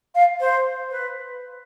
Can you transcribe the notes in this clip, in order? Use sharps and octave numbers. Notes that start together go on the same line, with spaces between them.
F5
C5
B4